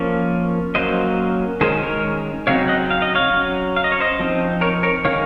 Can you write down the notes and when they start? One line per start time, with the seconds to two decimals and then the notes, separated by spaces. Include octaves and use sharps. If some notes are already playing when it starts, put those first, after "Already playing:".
Already playing: F3 A#3 C#4
0.75 F#3 A#3 C#4 C5 D#5
1.61 D#3 G#3 C#4 G#4 C5
1.83 A#4 C#5
2.47 C#3 F#3 C4 D#4 C#5 F5
2.68 D#5 F#5
2.91 F5
3.02 D#5
3.15 C#5 F5
3.34 F#3 C#4
3.76 F5
3.84 D#5
3.92 C#5
4.00 C5 D#5
4.19 F3 C4 D#4
4.61 A#4 C#5
4.83 A#4 C#5
5.05 D#3 G#3 C#4 C#5 F5